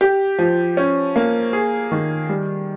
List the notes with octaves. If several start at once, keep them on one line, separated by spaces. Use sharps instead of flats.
G4
F3
C#4
A#3
G#4
D#3
G3